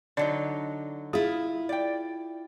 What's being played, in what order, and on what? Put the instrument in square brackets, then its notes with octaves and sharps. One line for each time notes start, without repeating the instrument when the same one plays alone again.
[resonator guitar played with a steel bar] D3 F#3 D#4 [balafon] D5
[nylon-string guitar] E4 F4 [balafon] G#4
[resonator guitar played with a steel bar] D5 G5